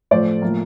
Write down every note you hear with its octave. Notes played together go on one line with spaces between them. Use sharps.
A2 F3 A3 C5 D5
A2 F3 A#3